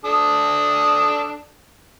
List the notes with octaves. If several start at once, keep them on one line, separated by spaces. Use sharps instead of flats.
D4 A4 D#6